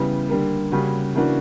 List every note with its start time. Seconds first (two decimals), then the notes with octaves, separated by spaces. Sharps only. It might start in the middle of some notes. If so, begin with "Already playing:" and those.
Already playing: C#3 E3 G3 B3
0.29 D3 G3 A#3
0.72 C#3 G3 A#3 C#4 F#4
1.15 C#3 E3 A#3 D4 F#4